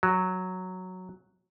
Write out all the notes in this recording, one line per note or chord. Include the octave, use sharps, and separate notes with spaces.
F#3